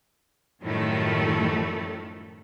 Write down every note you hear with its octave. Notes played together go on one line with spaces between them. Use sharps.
F#2 A2 D#3 F3 G3 A3